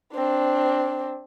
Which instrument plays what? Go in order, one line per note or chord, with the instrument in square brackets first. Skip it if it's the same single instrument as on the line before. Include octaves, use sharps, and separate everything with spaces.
[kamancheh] C4 D4